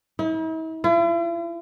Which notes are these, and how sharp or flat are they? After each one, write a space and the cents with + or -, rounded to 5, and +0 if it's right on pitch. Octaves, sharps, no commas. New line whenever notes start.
E4 -45
E4 +45